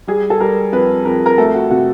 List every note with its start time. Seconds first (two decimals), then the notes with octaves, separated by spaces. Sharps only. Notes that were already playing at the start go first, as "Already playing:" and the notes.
0.07 G3 G#4
0.30 A4
0.40 G3 A#4
0.73 F2 B4
1.05 F2 A#4
1.26 A#4
1.38 A3 A4
1.55 F#4
1.70 C3 F#4